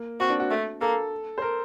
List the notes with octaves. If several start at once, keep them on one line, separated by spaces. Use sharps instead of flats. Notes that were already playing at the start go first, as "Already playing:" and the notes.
Already playing: A#3
C4 F#4
D4
F#4
A3
A#3 A4
C5
A#4